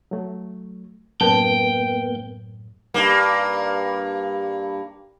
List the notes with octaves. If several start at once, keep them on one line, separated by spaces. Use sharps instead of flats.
F#3 A3
F#2 A2 A#3 B3 A#4 G5 A5
G2 A#3